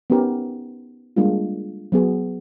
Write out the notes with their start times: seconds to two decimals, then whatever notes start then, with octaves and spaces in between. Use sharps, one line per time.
0.10 B3 C#4 D#4 G4 A#4
1.16 G3 G#3 A#3 D4 F4
1.92 F#3 B3 G#4